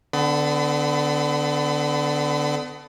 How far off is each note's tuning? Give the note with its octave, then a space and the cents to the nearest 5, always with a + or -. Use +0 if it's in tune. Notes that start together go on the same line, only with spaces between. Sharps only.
D3 +0 B3 +35 B5 +40